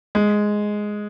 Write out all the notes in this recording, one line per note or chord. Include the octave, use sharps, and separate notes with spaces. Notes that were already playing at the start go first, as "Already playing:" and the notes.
G#3